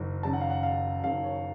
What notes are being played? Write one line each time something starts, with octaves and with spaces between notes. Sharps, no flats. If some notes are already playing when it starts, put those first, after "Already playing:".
Already playing: F#1 F#2 D#3
F#1 F#2 D#3 A5
F#5
F5
F#5
F5
F#1 F#2 D#3 F5
C#5